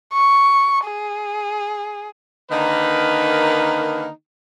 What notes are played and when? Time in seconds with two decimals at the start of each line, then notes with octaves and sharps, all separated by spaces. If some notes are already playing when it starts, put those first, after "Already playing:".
0.13 C#6
0.85 G#4
2.51 D3 D#3 A#3 D#4 A#4 B4